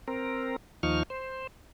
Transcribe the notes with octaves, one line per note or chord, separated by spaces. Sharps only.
C4 A#4
D#2 F3 D#4 C#6 F6
C5